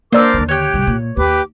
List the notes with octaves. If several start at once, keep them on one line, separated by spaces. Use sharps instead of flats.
A#3 D4 A#4 C5 D5 D6 E6
D#2 D3
G4 C#5 F#6 G6
C2 G2
A#2
D#2 G4 B4 D6